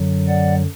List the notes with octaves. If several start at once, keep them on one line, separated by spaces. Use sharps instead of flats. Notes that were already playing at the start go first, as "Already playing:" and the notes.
Already playing: F#2 D3 F#3
D5 F#5